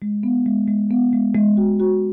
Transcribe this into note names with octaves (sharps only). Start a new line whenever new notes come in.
G#3
B3
G#3
G#3
B3
G#3
G#3
F#4
F#4